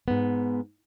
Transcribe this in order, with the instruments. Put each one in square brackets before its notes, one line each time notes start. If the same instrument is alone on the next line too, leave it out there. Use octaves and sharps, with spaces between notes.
[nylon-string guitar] G#2 B3